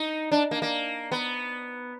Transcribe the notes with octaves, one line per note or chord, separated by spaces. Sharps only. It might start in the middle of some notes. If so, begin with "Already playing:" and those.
Already playing: D#4
D4
A#3
A#3
B3